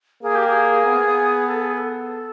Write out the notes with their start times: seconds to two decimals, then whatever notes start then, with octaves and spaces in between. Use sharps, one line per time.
0.23 A#3 G#4
0.35 G4
0.47 G#4
0.86 B3
1.47 A4
1.61 G#4
1.74 B4
1.78 A4